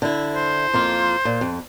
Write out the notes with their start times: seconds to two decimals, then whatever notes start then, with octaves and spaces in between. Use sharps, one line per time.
0.02 D3 E4
0.35 C5
0.74 F2 A#3 F4
1.25 A#2
1.41 F2